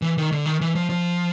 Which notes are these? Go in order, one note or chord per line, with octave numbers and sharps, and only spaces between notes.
E3
D#3
D3
D#3
E3
F3
F3